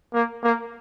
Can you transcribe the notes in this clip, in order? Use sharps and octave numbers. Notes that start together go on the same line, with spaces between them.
A#3
A#3